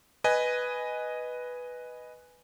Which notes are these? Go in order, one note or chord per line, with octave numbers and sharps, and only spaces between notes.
B4 D#5 G#5